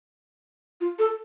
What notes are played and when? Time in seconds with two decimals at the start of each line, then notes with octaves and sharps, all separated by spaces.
0.81 F4
0.99 A4